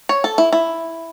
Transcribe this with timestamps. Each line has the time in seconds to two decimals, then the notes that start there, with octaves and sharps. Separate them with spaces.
0.09 C#5
0.24 A4
0.38 E4
0.53 E4